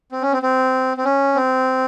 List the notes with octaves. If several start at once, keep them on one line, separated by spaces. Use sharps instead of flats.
C4
C#4
C4
C4
C4
C#4
C4